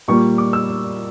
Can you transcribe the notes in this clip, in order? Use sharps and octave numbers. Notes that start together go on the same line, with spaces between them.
A#2 G3 A#3 C#6
D6
E6